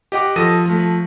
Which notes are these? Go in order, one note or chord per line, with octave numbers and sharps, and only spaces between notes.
G4 D#5 F#5 D6
F3 A4 D#6 A#6 D#7
F3 A3